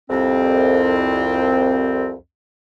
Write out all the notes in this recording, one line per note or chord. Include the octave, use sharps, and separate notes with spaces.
C2 F2 C4